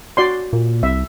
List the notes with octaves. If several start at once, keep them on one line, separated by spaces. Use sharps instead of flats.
F#4 D5 C6
A#2
C2 E5